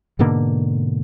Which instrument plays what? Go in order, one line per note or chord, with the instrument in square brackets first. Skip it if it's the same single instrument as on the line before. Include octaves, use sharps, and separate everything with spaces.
[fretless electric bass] G#2 B2 D3 A#3